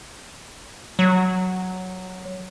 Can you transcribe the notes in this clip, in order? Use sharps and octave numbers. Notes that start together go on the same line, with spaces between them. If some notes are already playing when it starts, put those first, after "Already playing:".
F#3